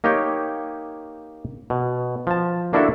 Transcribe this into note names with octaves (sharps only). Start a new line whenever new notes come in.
A#3 D#4 G4 C#5 G5
B2
F3 A5
A#3 D4 E4 F#4 A4 E5